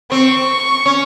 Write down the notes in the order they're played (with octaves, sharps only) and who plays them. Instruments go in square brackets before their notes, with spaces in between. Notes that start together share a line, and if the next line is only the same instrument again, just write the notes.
[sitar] C4 [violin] C#6
[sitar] C#4